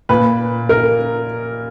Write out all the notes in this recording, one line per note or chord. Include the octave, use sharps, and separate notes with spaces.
A#2 B4
A#4